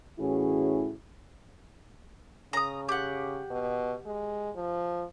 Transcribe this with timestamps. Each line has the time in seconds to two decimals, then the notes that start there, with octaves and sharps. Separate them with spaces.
0.20 A2 E3 C#4 E4 F#4 G#4
2.53 C#3 A#5 D#6
2.89 G4 F#5
3.50 B2
4.06 G#3
4.56 F3